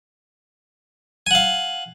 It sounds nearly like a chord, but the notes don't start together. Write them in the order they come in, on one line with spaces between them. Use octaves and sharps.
G#5 F#5 F5